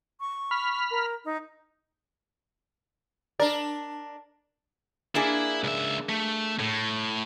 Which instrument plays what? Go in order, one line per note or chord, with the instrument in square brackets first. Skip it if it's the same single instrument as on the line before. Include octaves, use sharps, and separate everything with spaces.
[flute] C#6
[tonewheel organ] B5 F6
[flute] A#4
D#4
[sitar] D4 A#4 [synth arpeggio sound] D5
[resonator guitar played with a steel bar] A#3 D4 G#4 [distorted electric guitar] E4
[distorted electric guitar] C#2 E5
A3
A2